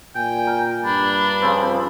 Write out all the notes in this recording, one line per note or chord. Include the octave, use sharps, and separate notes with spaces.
A#2 G5 G#5
A#4
G2 D4 B5
C#3 F3 C4